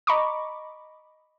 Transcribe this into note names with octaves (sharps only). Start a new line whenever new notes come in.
D#5 A#5 B5 C#6 D6